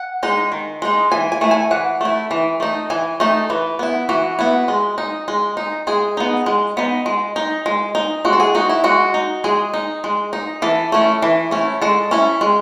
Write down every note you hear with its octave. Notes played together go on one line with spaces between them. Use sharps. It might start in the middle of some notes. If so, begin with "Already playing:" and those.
Already playing: F#5
G#3 D#4
D#3
G#3 D#4
E3 G#5
G#5
A3 E4
G#5
E3 F#5
A3 E4
E3
A3 D#4
E3 G#5
A3 D#4
E3 B4
B3 E4
E3 F#4
B3 E4
G#3
D#4
G#3
D#4
G#3 G#4
B3 D#4
G#3
B3 D#4
G#3
D#4
G#3
D#4
G#3 F#4
A4
G#4
D#4 F#4
E4
G#3 F#4
D#4
G#3 G#4
D#4
G#3
D#4
E3 A4
A3 C#4 E4
E3
A3 C#4 E4
G#3 A4
C#4 E4
G#3